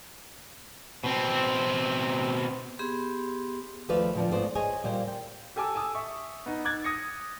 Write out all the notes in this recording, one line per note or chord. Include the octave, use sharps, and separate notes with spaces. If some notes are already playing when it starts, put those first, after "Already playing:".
B2 C4
B3 G4 G#4 C6
D#2 F3 A3 B4 D5 F5
A#2 D3 F3 C4 D4
G#2 A3 B3 F4 C5 D5
G#4 C5 C#5 D#5 G#5
A#2 G3 A#3 C5
G5
G4 A4 G#5 A5 D6 E6
G#5 A5 D#6 E6
E5 C#6
B3 D#4
D6 F#6 G#6 A6
D#6 A#6 C#7